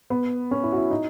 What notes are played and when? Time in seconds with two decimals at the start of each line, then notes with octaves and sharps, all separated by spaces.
0.10 B3
0.51 C#4
0.64 E4
0.72 F#4
0.78 E4
0.91 D#4